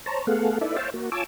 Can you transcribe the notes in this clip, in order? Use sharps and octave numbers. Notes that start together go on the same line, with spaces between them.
C5 C#5 A5 A#5
A3 B3 G#4 A4 F5 F#5
D#4 E4 A4 B4 D5 E5
C5 C#5 E5 F5 G5 A5
A#3 F#4
F4 C#5 G#5 A5 D6 E6